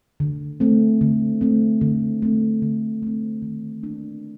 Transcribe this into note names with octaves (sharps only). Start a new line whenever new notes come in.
D3
A3 C4
D3
A3 C4
D3
A3 C4
D3
A3 C4
D#3
A#3 D4